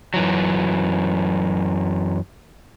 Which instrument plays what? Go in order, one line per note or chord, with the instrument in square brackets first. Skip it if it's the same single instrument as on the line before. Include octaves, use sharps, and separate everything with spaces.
[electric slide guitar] F#2 E3 F#3